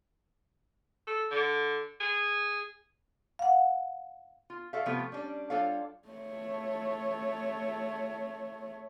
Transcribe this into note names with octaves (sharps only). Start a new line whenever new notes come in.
A4
D3
G#4
F5 F#5
F4
F#4 A4 D5 E5 F5
C3 F3 A3 B3 F4 G4
A3
G3 C#4 D4
G3 D4 F4 A4 C#5 F5
A3 C#5